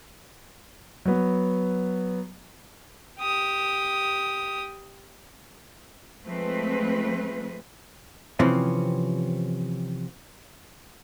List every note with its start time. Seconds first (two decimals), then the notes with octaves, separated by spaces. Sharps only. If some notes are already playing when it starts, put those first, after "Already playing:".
1.06 F#3 B3
3.20 G4 D#6
6.26 F3 G#3 A3 C4 B4
8.39 C3 E3 F3 C4 C#4